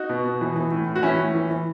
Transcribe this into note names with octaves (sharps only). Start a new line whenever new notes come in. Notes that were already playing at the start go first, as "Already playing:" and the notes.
Already playing: D#4 F#4
B2
B2
E3
E3
A2
A2
F#4
E3 C#4 E4
A2
E3
E3